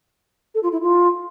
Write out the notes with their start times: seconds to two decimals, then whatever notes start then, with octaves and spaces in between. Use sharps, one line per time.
0.55 A4
0.63 F4
0.72 E4
0.83 F4